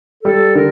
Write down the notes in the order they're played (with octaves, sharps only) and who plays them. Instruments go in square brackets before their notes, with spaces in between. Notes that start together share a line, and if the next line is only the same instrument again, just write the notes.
[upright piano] G3 [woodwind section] A4
[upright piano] D3 [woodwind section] A#4